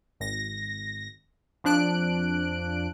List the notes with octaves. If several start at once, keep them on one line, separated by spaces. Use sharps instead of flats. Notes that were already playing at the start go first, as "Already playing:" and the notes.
G#1 A#6
F2 F3 D4 F#6 D7